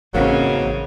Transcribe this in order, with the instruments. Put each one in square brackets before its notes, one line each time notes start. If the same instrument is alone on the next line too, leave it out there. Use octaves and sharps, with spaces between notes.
[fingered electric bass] A1 [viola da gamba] F#2 C#3 [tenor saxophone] F#3 [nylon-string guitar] A#3 C4 D#4